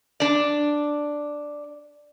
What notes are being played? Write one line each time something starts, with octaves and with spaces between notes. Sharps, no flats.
D4 D5